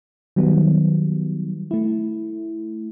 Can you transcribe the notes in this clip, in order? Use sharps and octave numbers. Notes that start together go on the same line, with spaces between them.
D#3 F#3 G3 B3
A3 E4